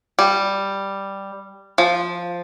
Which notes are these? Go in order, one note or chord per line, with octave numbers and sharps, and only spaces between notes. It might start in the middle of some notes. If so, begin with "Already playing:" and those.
G3
F3